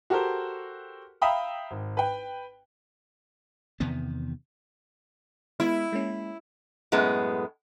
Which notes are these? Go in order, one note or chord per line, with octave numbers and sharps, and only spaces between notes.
F#4 G4 A4 A#4 C5
E5 F5 G5 A#5 B5 D#6
G#1
B4 G5
E2 C3 D#3 B3
G#3 B3 E4
G#3 A#3 C#4
F#2 A2 G#3 B3